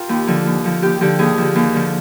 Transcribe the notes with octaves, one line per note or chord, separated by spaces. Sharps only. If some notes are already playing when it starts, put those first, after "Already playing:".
Already playing: F4 G4 A#4
D#2
D3 F3
D#2
D3 F3
D#2 G4
D3 F3 G4
D#2 G#4
D3 F3
D#2
D3 F3